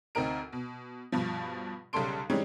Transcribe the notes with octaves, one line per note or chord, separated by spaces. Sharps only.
D2 C4 D#4 A#4 D7
B2
G2 B2 F3
B1 C#3 G3 A4 C6 D7
E3 G3 G#3 C4 C#4 D#4